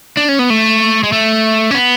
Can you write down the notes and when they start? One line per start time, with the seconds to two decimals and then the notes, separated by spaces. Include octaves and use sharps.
0.17 D4
0.29 C#4
0.39 B3
0.50 A3
1.03 G#3
1.12 A3
1.71 C#4
1.75 B3